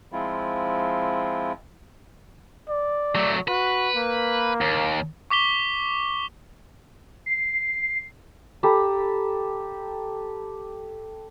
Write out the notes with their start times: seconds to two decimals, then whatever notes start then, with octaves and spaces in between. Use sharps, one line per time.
0.12 F3 G#3 C4 E4 F4
2.69 D5
3.15 F#3 A3
3.48 F#4 B4
3.95 A#3
4.61 D#2
5.30 C#6 D6 B6 G7
7.26 C7
8.63 G4 A4 A#5 B5